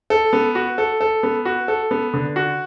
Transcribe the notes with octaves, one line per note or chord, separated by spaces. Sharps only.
A4
B3
F#4
A4
A4
B3
F#4
A4
B3
D3
F#4